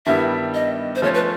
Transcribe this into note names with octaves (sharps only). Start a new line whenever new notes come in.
G2 D#3 G3 B3 E4 E5
D#5
C5
F3 A3 C#4 C#5
B4